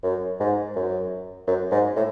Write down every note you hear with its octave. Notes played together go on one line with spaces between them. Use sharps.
F#2
G#2
F#2
F#2
G#2
A2